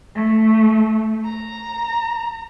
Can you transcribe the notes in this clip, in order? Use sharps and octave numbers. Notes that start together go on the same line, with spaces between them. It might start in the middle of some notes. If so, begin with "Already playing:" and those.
A3
A#5